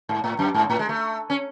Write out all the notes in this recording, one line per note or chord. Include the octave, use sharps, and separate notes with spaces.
G#2
A2
F#2
G#2
A2
G#3
A3
C#4